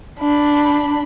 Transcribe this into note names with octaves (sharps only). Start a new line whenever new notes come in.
D4 B5